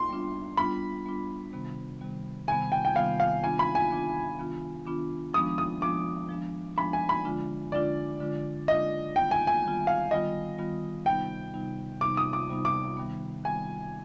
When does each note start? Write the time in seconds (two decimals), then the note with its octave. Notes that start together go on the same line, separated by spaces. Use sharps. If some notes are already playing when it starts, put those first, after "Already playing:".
Already playing: C6
0.09 G3 B3 D4 F4
0.57 G3 B3 D4 F4 B5
1.06 G3 B3 D4 F4
1.53 C3 D#3 G3 B3
2.00 C3 D#3 G3 B3
2.48 C3 D#3 G3 B3 G#5
2.72 G5
2.85 G5
2.95 C3 D#3 G3 B3 F5
3.20 F5
3.43 D#3 B3 D4 F4 G#5
3.59 B5
3.75 G#5
3.90 D#3 B3 D4 F4
4.39 D#3 B3 D4 F4
4.86 D#3 B3 D4 F4
5.34 F3 G#3 B3 D4 D#6
5.58 D#6
5.81 F3 G#3 B3 D4 D6
6.29 F3 G#3 B3 D4
6.77 F3 G#3 B3 D4 B5
6.93 G#5
7.09 B5
7.25 D3 G#3 D4 F4
7.72 D3 G#3 D4 F4 D5
8.20 D3 G#3 D4 F4
8.68 D3 G#3 D4 F4 D#5
9.16 D#3 G3 B3 F4 G5
9.31 G#5
9.47 G#5
9.64 D#3 G3 B3 F4
9.87 F5
10.11 D#3 G3 B3 F4 D#5
10.58 D#3 G3 B3 F4
11.06 C3 G3 B3 D#4 G5
11.54 C3 G3 B3 D#4
12.01 C3 G3 B3 D#4 D6
12.17 D#6
12.33 D6
12.50 C3 G3 B3 D#4
12.65 D6
12.97 D#3 G3 B3
13.44 D#3 G3 B3 G#5